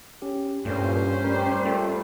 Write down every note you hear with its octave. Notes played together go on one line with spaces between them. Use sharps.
C#4 G4
C2 G2 A#2 A3 C#4 G4 C5
G3 A#4
A3 F4